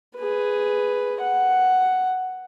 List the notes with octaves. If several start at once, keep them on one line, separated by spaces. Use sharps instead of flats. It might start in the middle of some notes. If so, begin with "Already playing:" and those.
G#4 B4
F#5